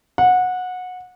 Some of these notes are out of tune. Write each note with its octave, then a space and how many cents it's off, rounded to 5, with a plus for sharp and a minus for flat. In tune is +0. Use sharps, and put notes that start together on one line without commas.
F#5 -20